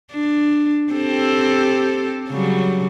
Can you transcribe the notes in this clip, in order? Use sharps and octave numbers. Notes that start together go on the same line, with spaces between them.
D4
C4 G4 A4
C#3 F#3 G3